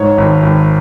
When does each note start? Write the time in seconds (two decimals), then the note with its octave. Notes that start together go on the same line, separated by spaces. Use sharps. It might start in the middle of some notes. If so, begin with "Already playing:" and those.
Already playing: G#2 C#5
0.18 G#1
0.43 G#1